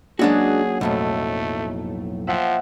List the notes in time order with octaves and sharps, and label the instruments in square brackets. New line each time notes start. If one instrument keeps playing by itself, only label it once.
[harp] F#3 A#3 C#4 [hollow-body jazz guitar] G#3 D4 F#4 [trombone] G#4
[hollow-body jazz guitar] B1 F2 A2 [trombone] A3
[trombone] F3 [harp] E5 F#5 G5